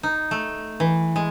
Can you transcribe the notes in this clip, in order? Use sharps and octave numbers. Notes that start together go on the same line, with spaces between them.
D#4
A3
E3
G#3